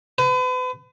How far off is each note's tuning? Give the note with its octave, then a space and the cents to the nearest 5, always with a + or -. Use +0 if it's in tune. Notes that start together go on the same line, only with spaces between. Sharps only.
B4 +40